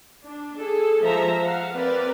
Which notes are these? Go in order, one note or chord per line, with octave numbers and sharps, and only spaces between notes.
D4
G#4 A4
F3 G#3 E5 A#5
F5 F#5
C4 A#4 B4 D5